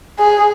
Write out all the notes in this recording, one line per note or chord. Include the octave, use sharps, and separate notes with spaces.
G#4